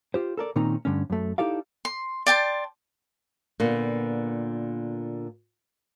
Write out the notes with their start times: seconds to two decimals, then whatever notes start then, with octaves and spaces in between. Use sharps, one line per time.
0.14 F4 G4 C5
0.37 A4 A#4 D5
0.56 A#2 D#3 C4 C#4 D#4 A#5
0.85 G2 D3 A3 C#4
1.10 F#2 A3
1.38 D#4 E4 G4 A4 D5 F5
1.85 C6
2.26 D5 G5 A5 C6
3.60 A#2 D3 A#3 B3